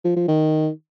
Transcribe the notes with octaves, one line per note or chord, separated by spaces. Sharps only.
F3
F3
D#3